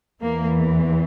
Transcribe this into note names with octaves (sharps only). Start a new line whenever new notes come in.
E2 E3 A#3